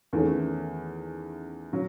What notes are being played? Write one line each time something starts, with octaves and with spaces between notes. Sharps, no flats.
E2 D#3 A3 C#4
F#3